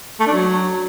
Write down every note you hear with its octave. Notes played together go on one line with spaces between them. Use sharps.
A3
D4
F#3